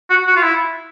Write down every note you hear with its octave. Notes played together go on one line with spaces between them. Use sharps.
F#4
F#4
F4
E4